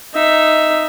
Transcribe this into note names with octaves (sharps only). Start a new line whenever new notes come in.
D#4 E5